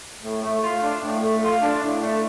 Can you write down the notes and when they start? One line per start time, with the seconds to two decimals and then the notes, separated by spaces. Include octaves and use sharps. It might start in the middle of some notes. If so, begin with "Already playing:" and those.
0.22 A2
0.42 A3
0.61 F4
0.81 D4
1.01 A2
1.21 A3
1.41 F4
1.61 D4
1.81 A2
2.01 A3